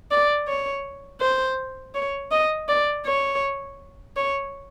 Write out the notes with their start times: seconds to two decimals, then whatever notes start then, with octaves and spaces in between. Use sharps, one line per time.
0.11 D5
0.48 C#5
1.21 C5
1.95 C#5
2.32 D#5
2.68 D5
3.06 C#5
4.17 C#5